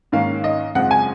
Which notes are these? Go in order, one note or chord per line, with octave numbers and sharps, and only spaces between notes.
G#2 D#3 A#3 C#4 F5
D#5
F#2 C#3 G#3 C4 F4 F#5
G#5